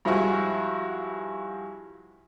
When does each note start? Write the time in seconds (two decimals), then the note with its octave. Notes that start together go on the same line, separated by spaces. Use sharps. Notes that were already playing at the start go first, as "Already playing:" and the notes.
0.05 G2 F3 G#3 E4 F#4